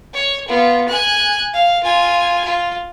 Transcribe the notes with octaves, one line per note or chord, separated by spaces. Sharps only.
C#5
B3 F4
G#5 F#6
F5
F4 G#5
F4